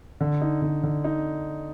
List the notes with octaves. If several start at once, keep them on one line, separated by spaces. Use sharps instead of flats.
D3
D#4
D3
D3
D#4